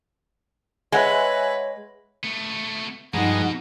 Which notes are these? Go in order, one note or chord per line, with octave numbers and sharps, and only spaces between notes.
G#3 B4 C#5 E5 F#5 G#5
A3 B3
G2 B2 F3 G#3 D#4 F#5 A#5